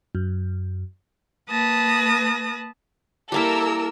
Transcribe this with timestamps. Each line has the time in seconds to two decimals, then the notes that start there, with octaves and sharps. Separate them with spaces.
0.15 F#2
1.49 A#3 B4 A5 D#6 A#6
3.32 G3 A#3 E4 A4 A#4 E6